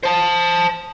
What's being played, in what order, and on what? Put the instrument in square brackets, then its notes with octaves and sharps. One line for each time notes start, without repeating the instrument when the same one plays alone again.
[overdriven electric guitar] C5 A5